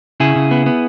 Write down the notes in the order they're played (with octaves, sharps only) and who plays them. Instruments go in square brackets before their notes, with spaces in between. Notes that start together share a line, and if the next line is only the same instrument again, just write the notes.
[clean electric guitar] C#3 E4 G#4
C#3
B3
B3